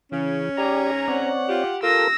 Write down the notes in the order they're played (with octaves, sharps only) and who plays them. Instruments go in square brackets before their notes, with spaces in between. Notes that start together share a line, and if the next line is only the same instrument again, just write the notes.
[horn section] C#3 [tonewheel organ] E3 [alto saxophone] C#4
[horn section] G#2 G#5 A#5 [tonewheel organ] G4 D5
[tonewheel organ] C4 C#5 D5 [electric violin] F#5
[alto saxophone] F4 [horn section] G4
[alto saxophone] F4 [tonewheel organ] A4 A#4 [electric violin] E6 A#6